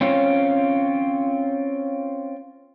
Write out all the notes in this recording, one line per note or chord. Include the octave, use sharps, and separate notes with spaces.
C4 C#4 F4